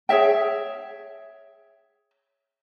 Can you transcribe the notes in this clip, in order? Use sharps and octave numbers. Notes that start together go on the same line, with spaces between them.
G#4 C#5 E5 G5